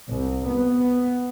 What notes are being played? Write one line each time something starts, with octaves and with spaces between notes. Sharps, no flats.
C2
B3